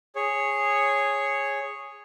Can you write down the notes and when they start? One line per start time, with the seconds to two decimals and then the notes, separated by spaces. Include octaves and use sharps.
0.16 G#4 C#5